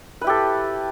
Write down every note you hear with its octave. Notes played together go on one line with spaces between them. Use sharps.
E4 G4 A4 B4